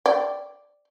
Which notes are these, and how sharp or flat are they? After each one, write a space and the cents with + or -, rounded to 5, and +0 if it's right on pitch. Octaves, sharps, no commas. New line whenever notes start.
D5 +0 G5 -5